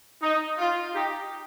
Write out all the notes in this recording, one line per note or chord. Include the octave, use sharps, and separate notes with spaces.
D#4
F4
D#4 G4